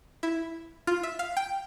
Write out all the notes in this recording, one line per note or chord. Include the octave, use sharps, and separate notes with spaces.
E4
F4
E5
F5
G5